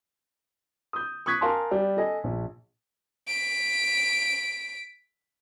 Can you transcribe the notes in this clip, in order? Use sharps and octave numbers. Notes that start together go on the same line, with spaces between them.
D#6 G6
C#6 D#6 F#6 G#6 B6
A#4 F5 G#5 A5 C6
G3
A4 D#5 G#5
A#1
B6 D7